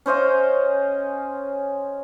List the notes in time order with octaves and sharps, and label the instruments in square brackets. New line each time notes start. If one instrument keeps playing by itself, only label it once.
[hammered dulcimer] C#4 C5 D#5 F5